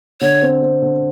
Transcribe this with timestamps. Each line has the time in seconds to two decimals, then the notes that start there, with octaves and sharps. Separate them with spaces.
0.21 D3 C#5
0.42 C4
0.62 C4
0.82 D3